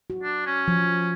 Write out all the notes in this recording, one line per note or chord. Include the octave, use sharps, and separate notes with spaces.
F#4
D4
C#4
F3